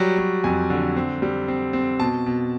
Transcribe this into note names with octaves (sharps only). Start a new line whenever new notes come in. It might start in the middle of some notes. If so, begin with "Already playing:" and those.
Already playing: F#3 G3
F#3
F2 G#5
D3
C4
G3
C4
C4
B2 A5
B2